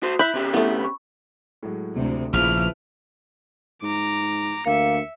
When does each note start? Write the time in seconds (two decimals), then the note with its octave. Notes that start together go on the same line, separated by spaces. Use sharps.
0.03 F#4 C5
0.19 E4 E5 B5 F#6 G6 F#7
0.34 C3 C#4 G4
0.54 A3 B3 E4 E5
0.80 B5 C#6
1.63 A2 F#3 G#3
1.95 D2 C3
2.33 A#1 C#3 F3 E4 B4 F6
3.82 G#2 A#5 D6
4.66 D2 A#3 E5 C#7